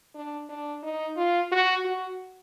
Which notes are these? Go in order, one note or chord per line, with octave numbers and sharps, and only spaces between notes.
D4
D4
D#4
F4
F#4
F#4